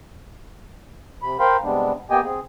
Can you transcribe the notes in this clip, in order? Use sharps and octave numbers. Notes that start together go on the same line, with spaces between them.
C3 B5
A#4 C5 F5 G5 B5 C6
C3 G3 G#3 B3 D4
A#3 B3 G4 D#5 G5 G#5
C4 G#4